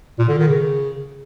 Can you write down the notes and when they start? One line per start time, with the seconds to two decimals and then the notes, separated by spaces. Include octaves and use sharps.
0.19 A#2
0.28 D3
0.38 D#3
0.48 C#3